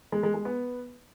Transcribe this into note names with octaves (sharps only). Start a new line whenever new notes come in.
G#3
G#3
G#3
B3